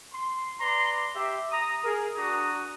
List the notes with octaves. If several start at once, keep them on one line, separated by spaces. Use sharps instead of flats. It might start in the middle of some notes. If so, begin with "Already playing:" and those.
C6
B4 D5 A#5 C6
G4 E5
A#5 D#6
G#4 A#4
D4 F#4 A#5 D#6